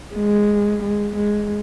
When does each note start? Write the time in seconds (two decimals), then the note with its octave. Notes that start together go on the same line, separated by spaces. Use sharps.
0.15 G#3
0.83 G#3
1.16 G#3